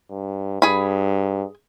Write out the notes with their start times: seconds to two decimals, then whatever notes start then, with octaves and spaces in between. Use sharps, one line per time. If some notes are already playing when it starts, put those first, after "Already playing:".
0.10 G2
0.62 G2 G#4 B5